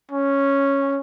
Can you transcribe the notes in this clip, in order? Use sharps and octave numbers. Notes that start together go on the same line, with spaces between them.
C#4